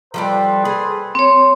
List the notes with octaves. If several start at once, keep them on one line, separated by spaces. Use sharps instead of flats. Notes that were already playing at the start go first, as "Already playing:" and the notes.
F3 G3 A4 B4 D5 C6
G#4
C4 C#5